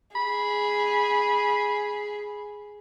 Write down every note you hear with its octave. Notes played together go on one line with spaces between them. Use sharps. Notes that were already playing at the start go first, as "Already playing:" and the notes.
G#4 B5